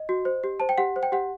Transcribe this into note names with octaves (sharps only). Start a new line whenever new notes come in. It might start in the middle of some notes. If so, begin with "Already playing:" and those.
Already playing: D#5
F#4
C5
G4
C5 A5
G5
G4 F#5
C5
G5
G4 F#5